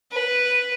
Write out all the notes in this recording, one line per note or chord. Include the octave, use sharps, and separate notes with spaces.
B4